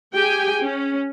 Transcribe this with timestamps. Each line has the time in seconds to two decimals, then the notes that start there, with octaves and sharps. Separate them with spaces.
0.14 G4 G#4 G5 G#5
0.62 C#4